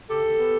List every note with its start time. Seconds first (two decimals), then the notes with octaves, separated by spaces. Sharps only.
0.09 C#3 G4 A4
0.24 D#2
0.38 B3